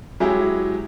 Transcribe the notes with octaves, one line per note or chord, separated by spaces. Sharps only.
F#3 G#3 E4 G4 G#4